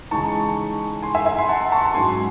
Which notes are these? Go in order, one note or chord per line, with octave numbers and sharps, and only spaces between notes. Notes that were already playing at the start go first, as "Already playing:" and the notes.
C#3 E3 G#3 D#4 A5 C#6
G#5 C6
E5 G#5
E5 G#5
C6
F#5 A5
A5 C#6
G#2 F#3 C#4 G#5 C6